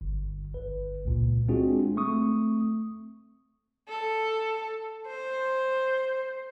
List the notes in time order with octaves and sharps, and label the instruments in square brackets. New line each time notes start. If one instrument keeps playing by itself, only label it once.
[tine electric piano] G1
G1 B4
C#2 A#2
G#3 C4 D4 F4 F#4 G#4
A3 C4 C#6 D#6
[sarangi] A4
C5